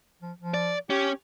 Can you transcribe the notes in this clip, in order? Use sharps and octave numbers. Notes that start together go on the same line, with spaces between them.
F3
F3
D5
C#4 G4